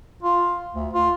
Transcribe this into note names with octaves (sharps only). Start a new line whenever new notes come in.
F4
D2
F4